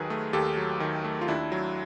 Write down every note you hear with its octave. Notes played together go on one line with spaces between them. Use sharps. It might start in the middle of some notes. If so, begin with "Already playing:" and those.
Already playing: D#2 D#3 F#3 G#4 A#4 B4
A3
D#2 G4 A4
F#3
D#3
A3
F4
D#2 D4 E4
F#3